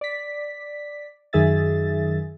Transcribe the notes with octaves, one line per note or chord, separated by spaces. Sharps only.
D5 B6
F#2 D#3 G#4 E5 A6